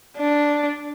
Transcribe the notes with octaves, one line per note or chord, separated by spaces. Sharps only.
D4